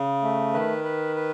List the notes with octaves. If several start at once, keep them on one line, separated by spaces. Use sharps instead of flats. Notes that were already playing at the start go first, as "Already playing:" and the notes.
Already playing: C#3
A3
D#3 B4
B4
B4